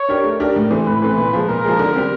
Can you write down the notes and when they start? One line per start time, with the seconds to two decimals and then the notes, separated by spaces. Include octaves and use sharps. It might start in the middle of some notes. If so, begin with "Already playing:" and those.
Already playing: C#5
0.09 D4 G4 A#4
0.24 A3
0.40 D4 G4 A#4
0.56 A2
0.70 E3 A3 C4
0.86 A2 B4
1.02 E3 A3 C4
1.18 A#2
1.33 F3 G#3
1.49 A#2 A#4
1.64 F3 G#3
1.79 D3
1.95 G3 C4